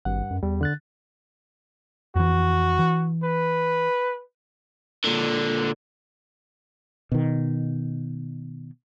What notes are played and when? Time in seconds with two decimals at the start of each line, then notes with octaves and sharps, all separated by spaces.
0.05 G#1 G2 F#5
0.30 F#2
0.43 E2 G3
0.61 D3 F#6 A6
2.16 F2 E3 F#4
2.79 E3
3.23 B4
5.05 A#2 D3
7.12 B2 D#3